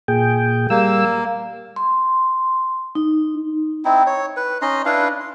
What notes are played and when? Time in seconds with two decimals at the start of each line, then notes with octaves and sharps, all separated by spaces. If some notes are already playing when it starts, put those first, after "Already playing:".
0.08 A#2 G#4 G5
0.70 G3 A#3 E6
1.76 C6
2.95 D#4
3.85 C4 D#4 E4
4.06 C#5
4.37 B4
4.62 C#4 D#4 D#5 C6
4.86 D4 E4 B4 F5
5.20 C6